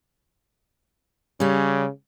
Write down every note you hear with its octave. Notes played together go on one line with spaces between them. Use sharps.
C#3 G3 C#4